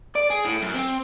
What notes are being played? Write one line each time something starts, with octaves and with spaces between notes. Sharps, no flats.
D5
G#4
A2
F#2
C4